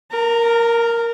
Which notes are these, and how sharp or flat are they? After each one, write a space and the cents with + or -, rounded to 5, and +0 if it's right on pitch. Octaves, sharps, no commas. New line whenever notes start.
A#4 +0 A#5 -35